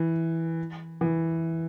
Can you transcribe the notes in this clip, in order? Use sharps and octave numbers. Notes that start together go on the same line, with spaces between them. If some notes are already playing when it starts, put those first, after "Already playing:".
Already playing: E3
E3